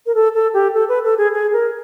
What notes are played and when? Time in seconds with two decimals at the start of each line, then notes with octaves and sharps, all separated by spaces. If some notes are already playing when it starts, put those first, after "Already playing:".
0.06 A#4
0.15 A4
0.34 A4
0.54 G4
0.74 A4
0.89 B4
1.04 A4
1.18 G#4
1.33 G#4
1.53 A#4